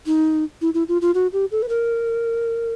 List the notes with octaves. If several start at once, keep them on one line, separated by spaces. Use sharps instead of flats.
D#4
E4
E4
F4
F4
F#4
G4
A4
B4
A#4